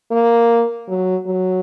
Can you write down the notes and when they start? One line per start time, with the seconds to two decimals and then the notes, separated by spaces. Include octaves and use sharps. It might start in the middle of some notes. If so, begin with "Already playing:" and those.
0.11 A#3
0.89 F#3
1.27 F#3